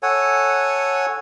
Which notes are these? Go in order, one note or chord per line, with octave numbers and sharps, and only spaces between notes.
A4 C#5 F#5 G#5